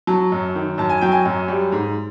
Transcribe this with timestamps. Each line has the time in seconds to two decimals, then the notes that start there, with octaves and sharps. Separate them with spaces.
0.07 F#3 A5
0.32 F#2
0.55 D#3
0.78 F#2 A5
0.90 G#5
1.01 F#3 G5
1.12 G#5
1.25 F#2
1.48 G3
1.72 G#2